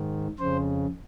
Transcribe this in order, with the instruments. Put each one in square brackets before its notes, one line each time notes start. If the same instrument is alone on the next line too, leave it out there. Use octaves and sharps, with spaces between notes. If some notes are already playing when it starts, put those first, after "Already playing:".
Already playing: [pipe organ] G#2 D#3
F2 C#3 C5